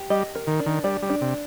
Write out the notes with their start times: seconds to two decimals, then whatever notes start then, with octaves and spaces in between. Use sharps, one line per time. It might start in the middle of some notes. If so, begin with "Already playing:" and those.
Already playing: G4
0.10 G3 D#5
0.35 A#4
0.47 D#3
0.60 D4
0.66 D#3
0.84 G3 D5
1.02 G3
1.09 D4
1.21 C3